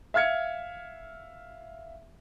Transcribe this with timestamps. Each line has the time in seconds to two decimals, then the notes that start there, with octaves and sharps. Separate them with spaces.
0.14 E5 F5 F6 G#6 C#7